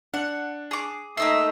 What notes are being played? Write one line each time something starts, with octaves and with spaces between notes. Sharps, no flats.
D4 F#5
G#4 D6
A3 A#3 D#4 D#5 E5 C7